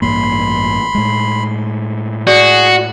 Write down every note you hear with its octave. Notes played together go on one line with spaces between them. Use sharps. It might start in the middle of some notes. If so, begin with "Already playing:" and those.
A1 G2 A#3 B5 C6
A2 G#3
F#4 G#4 D5